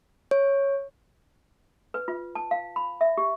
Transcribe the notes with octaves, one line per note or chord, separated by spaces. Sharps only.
C#5
B4
F4
A5
F5
B5
E5
G4